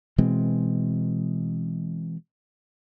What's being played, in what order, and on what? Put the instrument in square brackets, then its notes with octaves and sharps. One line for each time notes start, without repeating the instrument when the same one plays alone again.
[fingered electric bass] B2 E3 G#3 C4